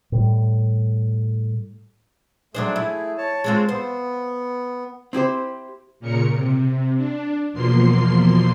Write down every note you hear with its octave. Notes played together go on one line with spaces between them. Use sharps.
A2 G3
F#3 A3 D4 G#4 C5
E4
C#5 A5
G#3 C4 F4
B3 C5
C4 E4 G4 C5
A#2 C#3 A#4 C#7
C3
D4
E2 B2 F3 A#3 C6 C7